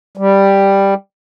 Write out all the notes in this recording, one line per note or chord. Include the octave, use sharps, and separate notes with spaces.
G3